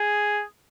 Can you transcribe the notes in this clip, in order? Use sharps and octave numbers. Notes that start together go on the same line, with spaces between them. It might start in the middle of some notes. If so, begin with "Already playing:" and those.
Already playing: G#4